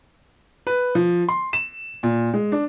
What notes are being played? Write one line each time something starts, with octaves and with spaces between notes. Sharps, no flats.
B4
F3
C6
E7
A#2
G#3
D4